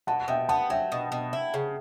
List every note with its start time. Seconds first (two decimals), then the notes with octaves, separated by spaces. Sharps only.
0.07 B2 F#5 A5
0.28 B2 E5 G5
0.49 B3 F#5 A5
0.70 F#3 E5 G5
0.92 B2
1.12 B2
1.33 E4
1.54 C#3